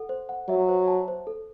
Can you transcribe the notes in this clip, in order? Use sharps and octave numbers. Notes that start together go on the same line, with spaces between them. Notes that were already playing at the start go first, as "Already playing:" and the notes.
Already playing: A4 F#5
C5
F#5
F#3 E5
C5
A5
C5
A4